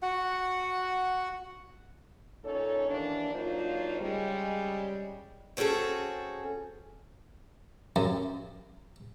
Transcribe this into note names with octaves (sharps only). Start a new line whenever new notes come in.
F#4 F#5
A#2 C#4 D#4 A4 C#5
D#2 E3 A#3 D4
F#3 A#3 D4 D#4 F4 C5
C#3 G3 G#3
C4 C#4 F#4 G#4 A4
F#2